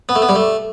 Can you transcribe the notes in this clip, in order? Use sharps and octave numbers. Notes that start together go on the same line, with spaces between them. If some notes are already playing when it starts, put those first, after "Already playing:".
B3
A3
B3
G3
A3